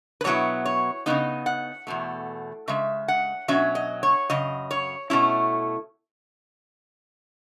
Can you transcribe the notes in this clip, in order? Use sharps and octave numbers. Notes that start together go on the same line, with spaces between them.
B4
B2 F#3 B3 E4 C#5
C#5
C#3 E3 B3 D#4 D#5
F#5
E2 B2 A3
C#3 G#3 E5
F#5
B2 F#3 C#4 E5
D#5
C#5
F#2 C#3 D#5
C#5
B2 A3 C#4 E4